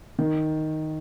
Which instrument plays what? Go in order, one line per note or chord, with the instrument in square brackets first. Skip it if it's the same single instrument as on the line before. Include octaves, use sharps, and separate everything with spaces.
[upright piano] D#3